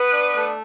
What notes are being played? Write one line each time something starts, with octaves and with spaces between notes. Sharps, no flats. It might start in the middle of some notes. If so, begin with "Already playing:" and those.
Already playing: B3 B4
D4
A3